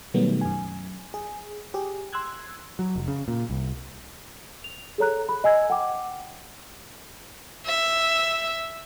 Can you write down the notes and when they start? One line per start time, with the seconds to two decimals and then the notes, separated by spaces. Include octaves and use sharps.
0.14 B2 D#3 F#3 G3 A3 B3
0.41 F#2 G#5
1.14 G#4
1.74 G4 G#4
2.13 C6 E6 F#6 G#6
2.79 F#3
2.96 F1
3.08 C#3
3.28 A#2
3.50 C2
4.64 F7
4.98 G#4 A4 C#5 A#5 F#6
5.29 B5
5.44 D#5 G#5 E6 G#6
5.70 F#5 G5 D6
7.66 E5